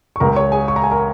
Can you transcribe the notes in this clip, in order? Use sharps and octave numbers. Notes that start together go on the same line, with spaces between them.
C#6
C#2 C#3 G#3 A#4 A#5
C#5 C#6
G#4 G#5
C#6
A#5
G#5
A#4 A#5